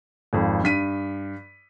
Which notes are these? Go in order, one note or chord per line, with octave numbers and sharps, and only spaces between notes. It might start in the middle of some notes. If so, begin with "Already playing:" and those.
G#1 F2
G2 B6 D#7